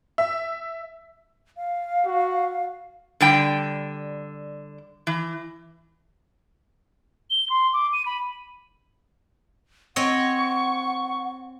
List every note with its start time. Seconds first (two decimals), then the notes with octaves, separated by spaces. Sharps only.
0.18 E5
1.57 F5
2.06 F#4
3.21 D3 G3 G5
5.07 E3
7.30 G7
7.50 C6
7.73 D6
7.93 D#7
8.06 B5
9.96 C4 C#5 D#5 F#5 C#6